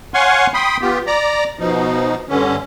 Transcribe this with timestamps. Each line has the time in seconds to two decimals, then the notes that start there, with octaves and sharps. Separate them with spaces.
0.14 C#5 F5 F#5 G#5 C6 C#6
0.54 G5 B5 C6 D#6
0.81 B3 F4 G4
1.07 D5 A#5
1.59 B2 F3 D#4
2.29 G2 D3 C#4